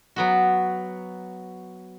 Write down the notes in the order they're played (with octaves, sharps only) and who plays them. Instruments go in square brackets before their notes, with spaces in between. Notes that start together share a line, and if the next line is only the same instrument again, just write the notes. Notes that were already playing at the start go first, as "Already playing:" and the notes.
[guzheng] F#3 B3 F#4